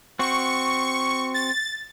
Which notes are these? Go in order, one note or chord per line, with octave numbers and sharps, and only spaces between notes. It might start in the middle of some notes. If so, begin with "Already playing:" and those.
C4 F#4 C#6
A6